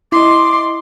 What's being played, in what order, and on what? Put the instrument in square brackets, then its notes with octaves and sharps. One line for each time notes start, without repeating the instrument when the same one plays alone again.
[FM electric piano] E4 D#5 [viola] C6 [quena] D6